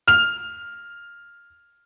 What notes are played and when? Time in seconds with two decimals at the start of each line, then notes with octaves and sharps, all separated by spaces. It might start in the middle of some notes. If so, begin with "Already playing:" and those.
0.08 F6 F7